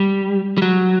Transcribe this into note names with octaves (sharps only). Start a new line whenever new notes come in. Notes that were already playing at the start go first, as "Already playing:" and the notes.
Already playing: G3
G3
F#3